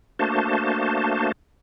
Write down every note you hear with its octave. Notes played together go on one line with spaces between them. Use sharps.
A3 A#3 D4 F#4 C5 A5